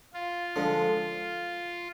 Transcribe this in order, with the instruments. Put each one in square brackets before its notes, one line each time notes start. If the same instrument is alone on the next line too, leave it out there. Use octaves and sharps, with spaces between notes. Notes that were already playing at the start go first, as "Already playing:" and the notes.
[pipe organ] F4
[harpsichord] D3 F3 G#3